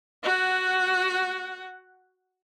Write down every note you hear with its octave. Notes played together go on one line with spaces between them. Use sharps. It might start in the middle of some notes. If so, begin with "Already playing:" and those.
F#4 F#5